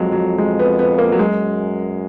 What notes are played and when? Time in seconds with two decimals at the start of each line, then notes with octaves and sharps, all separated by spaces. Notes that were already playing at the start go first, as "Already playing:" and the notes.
Already playing: F2 F#3 G#3
0.12 F#3
0.38 G#3
0.59 B3
0.79 B3
0.98 A#3
1.12 F#3
1.19 F#2 G#3